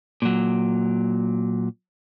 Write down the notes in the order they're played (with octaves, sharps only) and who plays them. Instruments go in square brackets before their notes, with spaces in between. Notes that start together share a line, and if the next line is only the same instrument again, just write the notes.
[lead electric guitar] A#2 F#3